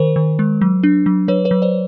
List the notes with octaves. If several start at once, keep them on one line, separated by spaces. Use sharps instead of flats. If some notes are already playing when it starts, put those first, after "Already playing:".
Already playing: D#3 A#4 C5
D#3
G#3
F#3
D4
F#3
F#3 B4 C#5
B4 C#5
F#3
C5 D5